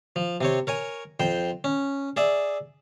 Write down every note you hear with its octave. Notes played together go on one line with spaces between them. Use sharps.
F3
C3 C4 C#5
A#4 C#5 G#5
F2 C5 G5
C#4
G#4 D5 E5